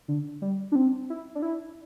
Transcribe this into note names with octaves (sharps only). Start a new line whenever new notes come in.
D3
G3
D4
C4
E4
D4
E4